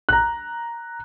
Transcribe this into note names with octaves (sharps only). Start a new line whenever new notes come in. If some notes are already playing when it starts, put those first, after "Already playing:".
A#5 F#6